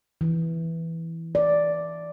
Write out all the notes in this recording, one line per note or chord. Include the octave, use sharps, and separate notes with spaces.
E3
D5